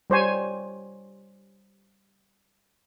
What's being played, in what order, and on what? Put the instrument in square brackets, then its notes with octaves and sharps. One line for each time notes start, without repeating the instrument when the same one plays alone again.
[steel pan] G3 C5 C#5 G#5